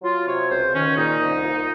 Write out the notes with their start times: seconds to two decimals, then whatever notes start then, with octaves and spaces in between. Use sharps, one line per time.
0.02 F#3 F4
0.25 C3 C#5
0.49 C#2 C5
0.73 D#3 C#4
0.96 A#2 D#4
1.20 C2
1.43 A#2